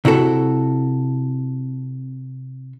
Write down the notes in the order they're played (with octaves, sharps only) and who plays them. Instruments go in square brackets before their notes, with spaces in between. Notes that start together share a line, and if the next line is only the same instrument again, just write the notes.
[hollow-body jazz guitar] C3 E4 F#4 A4